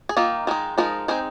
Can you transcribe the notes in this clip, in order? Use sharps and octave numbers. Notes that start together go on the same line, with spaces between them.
G#4
D#3 A#3 D#4 F4
D#3 G#3 D#4
F3 G#3 D#4 F4 A#4
G#3 C4 D#4 G#4 C5